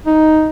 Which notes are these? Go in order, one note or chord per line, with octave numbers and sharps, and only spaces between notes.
D#4